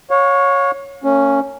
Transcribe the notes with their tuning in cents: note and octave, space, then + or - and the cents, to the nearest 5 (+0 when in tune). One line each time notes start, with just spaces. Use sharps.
C#5 +0 F5 +45
A#3 -45 C#4 +0